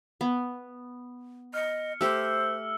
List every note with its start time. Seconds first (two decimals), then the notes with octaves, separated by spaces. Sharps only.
0.21 B3
1.54 D#5 F6 C#7
2.01 A3 G4 C5 E6